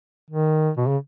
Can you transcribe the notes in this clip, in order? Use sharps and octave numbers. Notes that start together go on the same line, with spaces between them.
D#3
B2
C#3